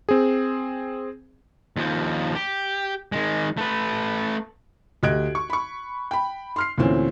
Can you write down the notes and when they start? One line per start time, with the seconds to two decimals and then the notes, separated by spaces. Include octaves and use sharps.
0.09 C4 G#4
1.76 D#2 F3
2.35 G4
3.12 D#3 G#3
3.57 A3 B4
5.03 D2 G4 D#5 F#6 G#6 D7
5.35 C#6
5.50 B5 C#6
6.11 G5 B5
6.56 C6 F6 C7
6.78 D2 A#2 E3 C4 C#4